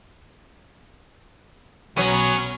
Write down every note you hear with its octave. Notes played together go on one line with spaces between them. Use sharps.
B1 F#3 B3 C#4